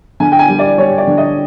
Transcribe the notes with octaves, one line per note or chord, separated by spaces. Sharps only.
D3 G#5
G5
G#5
G3
D5
G3 C#5
D5
D3
D#5